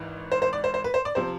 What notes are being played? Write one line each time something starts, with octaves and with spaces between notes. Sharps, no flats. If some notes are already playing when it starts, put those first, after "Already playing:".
Already playing: G#1 G#2 E3
C5
C5
D5
C5
C5
B4
C5
D5
C3 F3 C5